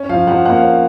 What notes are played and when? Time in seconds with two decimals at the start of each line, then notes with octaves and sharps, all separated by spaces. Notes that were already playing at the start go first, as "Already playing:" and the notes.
Already playing: C#4
0.09 F3 F5
0.27 F3 F#5
0.45 A#3 F#5
0.57 F5
0.64 C#4